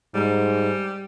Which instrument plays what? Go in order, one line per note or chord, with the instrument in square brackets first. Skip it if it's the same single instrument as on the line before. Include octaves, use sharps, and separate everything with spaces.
[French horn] G#2 [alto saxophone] G3